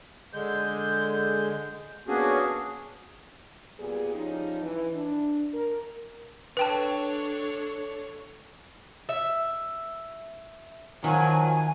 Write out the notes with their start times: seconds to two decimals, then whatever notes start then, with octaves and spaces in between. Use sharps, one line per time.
0.33 D3 G#3 G6
2.08 A#3 B3 C#4 D4 F#4 G#4
3.79 A#2 G3 B3 G#4
4.16 F3 G3 C#4 D#4
4.63 E3
4.95 D4
5.54 A#4
6.57 D4 A4 B4 C#5 G5 A5
9.09 E5
11.04 D#3 F3 F#3 F4 G#5